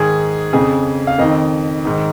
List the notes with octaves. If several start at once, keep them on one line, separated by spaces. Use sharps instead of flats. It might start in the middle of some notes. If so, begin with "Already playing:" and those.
Already playing: G#2 D#3 G#4
F2 C#3 G#4
F5
F2 D#3 D#5
G#2 D#3